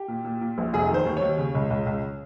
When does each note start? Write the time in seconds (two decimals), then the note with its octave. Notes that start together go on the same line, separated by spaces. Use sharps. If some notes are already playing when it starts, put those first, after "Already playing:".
Already playing: G4
0.08 A#2
0.25 A#2
0.41 A#2
0.58 A#1
0.73 F1 G#4
0.89 D#3
0.94 C5
1.06 D#2
1.17 C#5
1.22 D#2
1.38 C#3
1.55 C#2
1.70 C#2
1.86 C#2